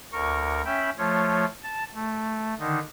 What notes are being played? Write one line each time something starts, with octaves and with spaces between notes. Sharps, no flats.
D2 A#4 C#6
C#4 E5 G5 B5
F3 A3 F4 C#5
A5
A3
D3 D#3 D#4